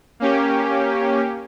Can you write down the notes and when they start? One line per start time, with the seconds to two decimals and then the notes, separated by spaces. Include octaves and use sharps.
0.20 A#3 C#4 G4